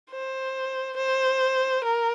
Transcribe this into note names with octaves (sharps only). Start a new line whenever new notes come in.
C5
C5
A#4